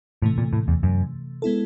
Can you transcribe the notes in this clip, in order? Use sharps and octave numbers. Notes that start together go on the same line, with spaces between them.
A2 C3 E3 A3
A#2
A2
E2
F#2
G#3 B3 E4 A4